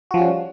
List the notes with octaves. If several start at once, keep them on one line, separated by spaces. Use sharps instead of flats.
F3 G3 C#4 F#4